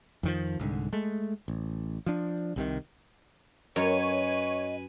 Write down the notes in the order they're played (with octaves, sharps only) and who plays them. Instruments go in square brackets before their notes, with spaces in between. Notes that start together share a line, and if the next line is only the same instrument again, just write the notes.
[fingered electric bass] F2 D#3 F3
C2 G#2 D3
G#3 A3
A1
F3 D4
C2 C3 D#3
[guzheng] F#2 [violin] B4 G#5 [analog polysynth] C#5 [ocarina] D#5